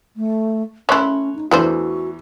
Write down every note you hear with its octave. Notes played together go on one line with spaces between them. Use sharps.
A3
A3 C#4 E4 C#5 C6 F#6
D#4
E2 E3 A3 D4 F#4 C5